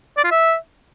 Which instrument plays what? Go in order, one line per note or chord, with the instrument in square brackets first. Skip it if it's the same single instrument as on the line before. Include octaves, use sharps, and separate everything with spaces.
[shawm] D5
F4
E5